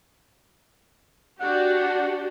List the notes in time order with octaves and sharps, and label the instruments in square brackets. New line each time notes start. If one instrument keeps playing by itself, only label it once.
[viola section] D4 F#4 G4 [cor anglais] F#5